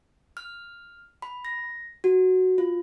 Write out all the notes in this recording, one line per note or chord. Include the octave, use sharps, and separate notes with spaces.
F6
B5
A#6
F#4
F4